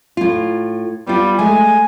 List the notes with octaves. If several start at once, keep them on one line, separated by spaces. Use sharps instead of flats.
A2 F4
G3 B3 F4
G#3 A3 G#5